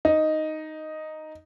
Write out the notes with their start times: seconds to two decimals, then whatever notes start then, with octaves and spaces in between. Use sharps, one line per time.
0.05 D#4